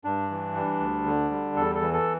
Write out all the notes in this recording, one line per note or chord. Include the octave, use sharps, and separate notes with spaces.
G2 D4
E3
G3
D2
D3
G3
E2 A4
A4
E3
A4